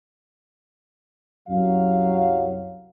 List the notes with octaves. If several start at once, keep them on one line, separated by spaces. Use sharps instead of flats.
C2 F#2 F#3 F5